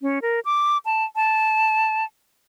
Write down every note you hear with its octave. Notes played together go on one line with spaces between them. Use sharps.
C#4
A#4
D6
A5
A5